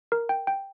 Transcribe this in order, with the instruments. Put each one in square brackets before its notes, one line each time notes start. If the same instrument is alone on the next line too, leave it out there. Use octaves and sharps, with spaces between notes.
[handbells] A#4
G5
G5